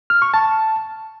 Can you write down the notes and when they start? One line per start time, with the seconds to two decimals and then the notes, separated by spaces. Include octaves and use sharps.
0.10 F6
0.22 C#6
0.34 A5